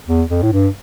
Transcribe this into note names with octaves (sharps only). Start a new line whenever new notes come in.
E2
F2
A2
G2